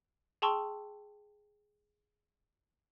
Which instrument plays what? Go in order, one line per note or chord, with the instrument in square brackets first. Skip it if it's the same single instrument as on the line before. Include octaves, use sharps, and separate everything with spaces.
[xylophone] G#4 G5 A5 C6 C#6 E6